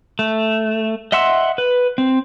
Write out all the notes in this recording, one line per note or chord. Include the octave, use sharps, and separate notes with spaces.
A3
D#5 E5 F#5 C6 E6
B4
C4